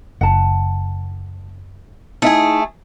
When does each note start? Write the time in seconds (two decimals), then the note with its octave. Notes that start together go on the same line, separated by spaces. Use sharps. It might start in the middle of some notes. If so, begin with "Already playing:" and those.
0.21 F#1 F#5 A5
2.22 A3 D#4 E4 G#4 E5